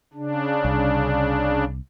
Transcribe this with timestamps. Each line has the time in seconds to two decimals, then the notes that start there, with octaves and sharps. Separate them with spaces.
0.14 C#3 D4
0.65 C2